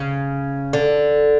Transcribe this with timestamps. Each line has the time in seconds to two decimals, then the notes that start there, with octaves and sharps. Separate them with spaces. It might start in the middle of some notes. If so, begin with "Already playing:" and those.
Already playing: C#3
0.73 D3